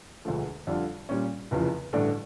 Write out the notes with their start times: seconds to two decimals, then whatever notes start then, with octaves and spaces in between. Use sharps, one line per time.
0.25 E1 D2 D3 F3 A3
0.67 F2 D3 G3 D4 F4
1.09 A#2 G3 C#4
1.51 F1 E2 C#3 F3
1.93 A1 G2 D3 A3 D4